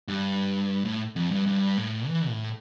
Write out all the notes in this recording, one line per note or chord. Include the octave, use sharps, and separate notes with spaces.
G2
A2
F2
G2
G2
A2
E3
A2